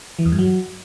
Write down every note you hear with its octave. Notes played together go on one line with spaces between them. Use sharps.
E3
E2
G2
F#3